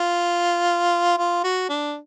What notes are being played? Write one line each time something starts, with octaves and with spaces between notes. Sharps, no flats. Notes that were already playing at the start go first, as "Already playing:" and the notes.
Already playing: F4
F4
F#4
D4